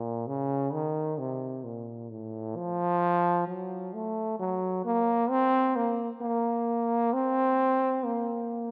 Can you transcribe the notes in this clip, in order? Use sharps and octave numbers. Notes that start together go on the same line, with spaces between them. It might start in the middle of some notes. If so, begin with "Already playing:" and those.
Already playing: A#2
C#3
D#3
C3
A#2
A2
F3
F#3
A3
F#3
A#3
C4
A#3
A#3
C4
A#3